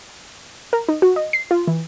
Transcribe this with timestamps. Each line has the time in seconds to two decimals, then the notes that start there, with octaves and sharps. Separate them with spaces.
0.73 A#4
0.88 D#4
1.02 F#4
1.16 D#5
1.33 C7
1.51 F4
1.67 E3